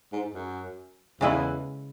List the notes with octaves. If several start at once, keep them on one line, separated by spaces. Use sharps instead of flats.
G#2
F#2
E2 C#3 G#3 E4 B4